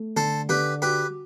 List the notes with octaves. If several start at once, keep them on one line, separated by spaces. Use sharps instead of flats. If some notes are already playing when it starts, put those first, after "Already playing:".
Already playing: A3
D3 A4 C5
D3 G4 B4
F#4 G4 B4